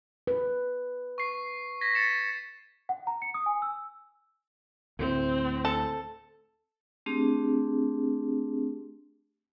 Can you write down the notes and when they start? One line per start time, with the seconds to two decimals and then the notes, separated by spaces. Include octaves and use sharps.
0.27 B4
1.18 C#6 C7
1.81 G#6 A#6 B6
1.95 A6 C#7 E7
2.89 F#5
3.07 A#5
3.22 C#7
3.34 D#6
3.46 G#5
3.62 E6
4.99 D2 A2 A3 C4
5.65 A4
7.06 A3 C4 D4 G4 G#4